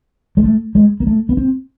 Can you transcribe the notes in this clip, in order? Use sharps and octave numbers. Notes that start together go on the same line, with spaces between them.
G#3
A3
G#3
A#3
A3
B3
C4